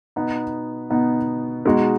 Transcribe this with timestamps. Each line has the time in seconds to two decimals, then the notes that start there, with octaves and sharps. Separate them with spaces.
0.16 B2 B3 D#4
0.90 B2 B3 D#4
1.65 B2 G#3 D#4 F#4